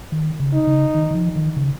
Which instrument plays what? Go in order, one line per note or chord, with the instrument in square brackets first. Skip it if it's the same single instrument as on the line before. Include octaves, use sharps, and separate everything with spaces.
[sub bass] D#3
C#3
[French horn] D#4
[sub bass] C#3
D#3
D#3
F3
D#3
C#3